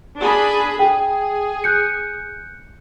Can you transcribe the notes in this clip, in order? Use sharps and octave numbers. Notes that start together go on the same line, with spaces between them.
D4 G#4 B5
G#4 G5
F#6 G6 C#7